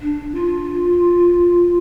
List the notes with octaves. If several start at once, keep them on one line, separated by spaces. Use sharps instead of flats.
D4
F4